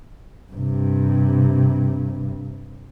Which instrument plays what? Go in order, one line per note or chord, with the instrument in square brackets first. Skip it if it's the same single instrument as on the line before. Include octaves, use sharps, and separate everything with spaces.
[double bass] G2 C3